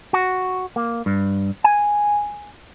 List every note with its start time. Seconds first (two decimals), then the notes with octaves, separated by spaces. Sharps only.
0.13 F#4
0.76 A#3
1.06 G2
1.64 G#5